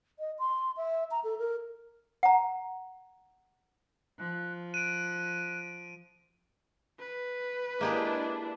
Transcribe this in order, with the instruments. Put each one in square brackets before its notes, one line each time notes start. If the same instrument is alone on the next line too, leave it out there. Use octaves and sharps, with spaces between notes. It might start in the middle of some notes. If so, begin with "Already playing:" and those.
[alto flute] D#5
C6
E5
A#5
A4
A#4
[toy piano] F#5 A#5
[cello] F3 [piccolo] F#6
[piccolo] F#6 [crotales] D7 D#7
[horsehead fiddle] B4
[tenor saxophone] G#3 [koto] A#3 G4 G#4 [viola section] D4 E4